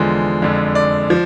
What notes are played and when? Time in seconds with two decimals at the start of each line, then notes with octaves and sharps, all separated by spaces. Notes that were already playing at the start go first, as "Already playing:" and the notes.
Already playing: E2 D3 F3 G#3
0.42 F2 D3 G#3
0.75 D5
1.10 F3